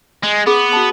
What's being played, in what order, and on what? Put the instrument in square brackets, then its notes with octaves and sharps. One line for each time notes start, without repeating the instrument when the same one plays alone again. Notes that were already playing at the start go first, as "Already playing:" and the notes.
[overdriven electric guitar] G#3
[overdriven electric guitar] B3 [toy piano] G#4
[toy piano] F#4 A5